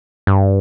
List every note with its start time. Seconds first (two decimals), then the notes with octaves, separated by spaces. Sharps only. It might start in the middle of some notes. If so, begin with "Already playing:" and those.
0.27 G2